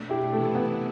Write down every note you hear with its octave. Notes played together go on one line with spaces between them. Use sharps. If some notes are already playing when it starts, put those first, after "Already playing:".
Already playing: B2 A3 D4
E4 G4
C3 E3 A3 B3 E4
B3